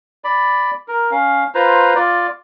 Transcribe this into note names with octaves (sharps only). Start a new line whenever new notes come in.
D5 B5
A#4
C#4 F5
F4 B4 C5 A#5
F4 D5